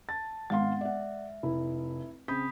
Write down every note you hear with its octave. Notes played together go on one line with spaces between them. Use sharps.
A5 A6
G#1 G#3 B3 F5 F#5 C6
D5 E5 F#5
F1 E4
C#3 C4 B5 D#6 G6 B6